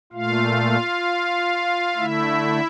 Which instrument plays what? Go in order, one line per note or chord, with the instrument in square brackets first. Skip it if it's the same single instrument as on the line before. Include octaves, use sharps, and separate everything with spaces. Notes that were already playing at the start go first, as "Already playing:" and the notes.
[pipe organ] A#2 A3 F4 F5
D3 A3 E4 E5